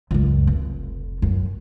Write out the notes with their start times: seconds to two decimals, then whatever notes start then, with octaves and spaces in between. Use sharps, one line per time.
0.11 C#2 F#2
0.47 F1
1.22 F#2